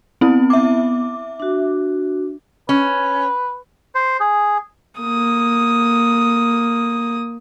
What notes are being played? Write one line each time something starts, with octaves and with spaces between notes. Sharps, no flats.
B3 C4 E4
E5 D6
D4 F#4
C#4 B4
C5
G#4
A#3 D#6